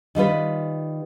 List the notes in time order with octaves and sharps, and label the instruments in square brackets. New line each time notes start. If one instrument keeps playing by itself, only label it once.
[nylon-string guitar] D#3 G3 F4 B4